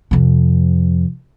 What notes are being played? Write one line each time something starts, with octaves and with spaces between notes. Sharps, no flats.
F2 C3